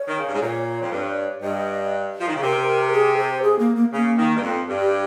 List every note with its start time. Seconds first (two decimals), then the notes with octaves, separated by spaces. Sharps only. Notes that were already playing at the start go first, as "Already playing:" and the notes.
Already playing: C#5
0.08 D#3
0.18 C#3
0.26 G2
0.34 G#2
0.41 A#2 C#5
0.81 F2
0.91 G2
1.42 G2 D#5
2.20 F3
2.27 D#3
2.35 C#3
2.42 C3 A#4
2.92 G#4
3.17 C5
3.43 G#4
3.59 A#3
3.76 A#3
3.93 C#3 A#3
4.18 D#3
4.36 G2
4.42 F2 C4
4.68 G2
4.80 G4